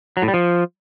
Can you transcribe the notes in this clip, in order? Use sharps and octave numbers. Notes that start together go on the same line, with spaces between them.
F#3
A2
G3
F3